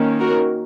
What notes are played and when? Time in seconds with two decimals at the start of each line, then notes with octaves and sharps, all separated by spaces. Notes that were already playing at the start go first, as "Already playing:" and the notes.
Already playing: D#3 A#3 C#4
0.20 F#4 A#4